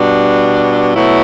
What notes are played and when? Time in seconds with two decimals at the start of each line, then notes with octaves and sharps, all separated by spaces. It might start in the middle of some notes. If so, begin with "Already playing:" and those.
Already playing: B2 G3 D4
0.95 B2 F#3 A3 E4